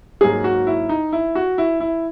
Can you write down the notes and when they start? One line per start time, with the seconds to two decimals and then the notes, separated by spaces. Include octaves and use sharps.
0.21 G#2 F#3 A#3 G#4
0.44 F#4
0.67 E4
0.89 D#4
1.13 E4
1.35 F#4
1.58 E4
1.80 E4